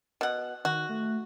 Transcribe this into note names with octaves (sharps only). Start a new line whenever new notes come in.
B2 F#5
D#3 F#4
A3